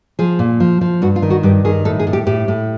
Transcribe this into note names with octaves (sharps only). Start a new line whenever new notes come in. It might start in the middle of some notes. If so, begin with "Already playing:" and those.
F3 G#4
A#2
F3
F3
G2 F#4
F4
D#3
F#4
G2 G4
D#3 G#4
A2 A4
G#4
A2
G4
A2 G4
A2